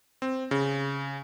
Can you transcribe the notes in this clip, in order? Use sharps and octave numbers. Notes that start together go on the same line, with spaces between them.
C4
C#3